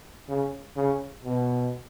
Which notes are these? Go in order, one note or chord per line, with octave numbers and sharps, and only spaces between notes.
C#3
C#3
B2